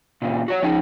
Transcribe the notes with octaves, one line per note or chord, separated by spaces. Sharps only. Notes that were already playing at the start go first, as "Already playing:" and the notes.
A#2 C#3
F#4 C#5
F3 C#4 D#4